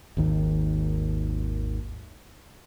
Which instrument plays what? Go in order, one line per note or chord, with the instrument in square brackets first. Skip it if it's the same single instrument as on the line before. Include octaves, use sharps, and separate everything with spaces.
[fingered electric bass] G#1 D#2 D#3